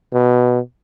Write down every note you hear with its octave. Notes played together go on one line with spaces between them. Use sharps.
B2